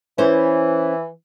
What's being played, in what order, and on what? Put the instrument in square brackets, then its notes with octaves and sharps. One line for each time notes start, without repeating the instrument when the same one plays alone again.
[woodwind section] E3 [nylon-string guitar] C#4 C5